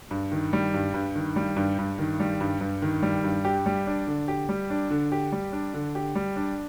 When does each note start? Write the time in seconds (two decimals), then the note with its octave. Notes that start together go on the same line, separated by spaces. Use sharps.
0.11 G2
0.32 D#3
0.53 G3
0.74 G2
0.94 G2
1.16 D#3
1.36 G3
1.57 G2
1.79 G2
1.99 D#3
2.20 G3
2.41 G2
2.61 G2
2.82 D#3
3.02 G3
3.24 G2
3.45 G4
3.66 G3
3.87 D4
4.07 D3
4.28 G4
4.49 G3
4.70 D4
4.90 D3
5.12 G4
5.32 G3
5.52 D4
5.74 D3
5.95 G4
6.15 G3
6.36 D4